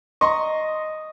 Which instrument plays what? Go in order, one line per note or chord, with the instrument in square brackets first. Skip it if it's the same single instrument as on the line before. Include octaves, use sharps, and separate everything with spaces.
[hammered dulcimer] D#5 [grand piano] A#5 C6 C#6